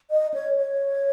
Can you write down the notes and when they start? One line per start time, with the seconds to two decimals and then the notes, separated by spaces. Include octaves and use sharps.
0.11 D#5
0.34 C#5
0.57 C#5